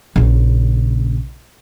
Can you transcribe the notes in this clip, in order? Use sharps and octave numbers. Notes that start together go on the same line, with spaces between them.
A#1 C#3